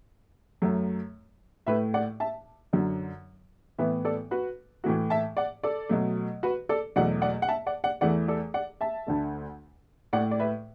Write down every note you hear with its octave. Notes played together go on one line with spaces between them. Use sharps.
F#2 F#3 A3
A2 A3 B4 E5
D5 F#5
E5 A5
F#2 D3 F#3
A2 E3 B3 B4 E5
A4 D5
F#4 B4
A2 E3 A3 F#4
E5 A5
D5 F#5
A4 D5
B2 F#3 A3
F#4 B4
A4 D5
E2 B2 F#3 A3 D5 F#5
D5 F#5
F#5
E5 A5
D5 F#5
D5 F#5
E2 E3 A3 D5 F#5
A4 D5
D5 F#5
E5 A5
D2 D3 A3
A2 A3 D5 F#5
D5
B4 E5